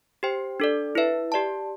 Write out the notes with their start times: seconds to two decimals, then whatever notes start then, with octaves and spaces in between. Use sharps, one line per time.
0.23 G4 C5 G5
0.60 D4 A4 D5
0.95 E4 B4 E5
1.32 G4 D5 A5